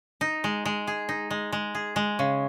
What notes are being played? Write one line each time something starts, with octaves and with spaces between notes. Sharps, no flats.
D#4
G#3
G#3
G#4
D#4
G#3
G#3
G#4
G#3
C#3